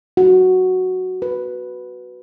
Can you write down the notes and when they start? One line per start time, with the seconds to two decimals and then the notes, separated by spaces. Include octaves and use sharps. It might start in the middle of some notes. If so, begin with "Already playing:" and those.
0.17 F#4
1.22 B4